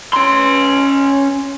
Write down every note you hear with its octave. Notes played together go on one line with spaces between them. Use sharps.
C#4 C6